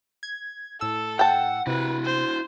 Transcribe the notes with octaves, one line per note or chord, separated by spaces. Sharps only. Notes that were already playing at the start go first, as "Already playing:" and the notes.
G#6
A2 A4 E6
F#5 G5 A5
C3 E4 F#4 B4
C5